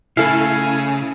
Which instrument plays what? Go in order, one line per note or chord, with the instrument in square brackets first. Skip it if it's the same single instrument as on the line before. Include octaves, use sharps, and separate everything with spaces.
[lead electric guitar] C#3 [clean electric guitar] A3 F5 [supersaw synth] E4 A4 [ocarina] G#5